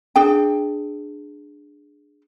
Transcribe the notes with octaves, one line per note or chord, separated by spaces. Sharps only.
D4 G#4 G5